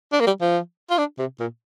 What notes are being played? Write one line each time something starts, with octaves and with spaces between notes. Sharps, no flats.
D4
A#3
G3
F3
F4
D4
C3
A#2